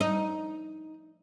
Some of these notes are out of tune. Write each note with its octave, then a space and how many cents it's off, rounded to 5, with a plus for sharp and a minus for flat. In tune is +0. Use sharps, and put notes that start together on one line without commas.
D#4 +10